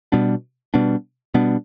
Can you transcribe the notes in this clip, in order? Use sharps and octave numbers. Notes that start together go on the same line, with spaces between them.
B2 G3 B3 D4
B2 G3 B3 D4
B2 G3 B3 D4